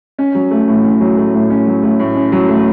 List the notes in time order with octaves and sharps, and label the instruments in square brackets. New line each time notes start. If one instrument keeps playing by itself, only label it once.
[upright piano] C#4
F#3
A3
A2
C#4
F#3
A3
A2
C#4
F#3
A3
A2
C#4
F#3
A3